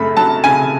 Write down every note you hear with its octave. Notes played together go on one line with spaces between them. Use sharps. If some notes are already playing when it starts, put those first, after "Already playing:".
Already playing: F#2 C#3 A3 B5
F#3 A5
C#3 G#5